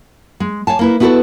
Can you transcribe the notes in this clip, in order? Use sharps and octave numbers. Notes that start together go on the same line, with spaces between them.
G#3
C#5 F5 G#5 A5
A#3 E4 B4
B3 E4 F#4 G#4 A4 B4